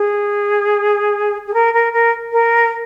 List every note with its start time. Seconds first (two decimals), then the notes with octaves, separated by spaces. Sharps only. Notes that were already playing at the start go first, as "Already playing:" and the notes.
Already playing: G#4
1.46 G#4
1.54 A#4
1.73 A#4
1.93 A#4
2.32 A#4